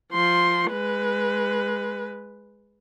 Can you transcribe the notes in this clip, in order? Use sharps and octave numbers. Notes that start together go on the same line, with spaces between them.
F3 C6
G#3 B4